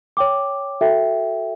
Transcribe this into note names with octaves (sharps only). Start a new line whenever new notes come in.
C#5 G5 D6
F#4 A4 E5 G5